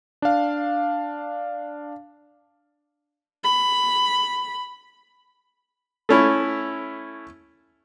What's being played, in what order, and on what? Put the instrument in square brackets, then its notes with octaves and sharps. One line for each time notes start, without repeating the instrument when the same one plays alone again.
[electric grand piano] D4 F5
[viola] B5
[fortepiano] A3 C#4 E4